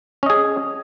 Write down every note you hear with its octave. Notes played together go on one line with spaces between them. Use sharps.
C#4 G#4 D#5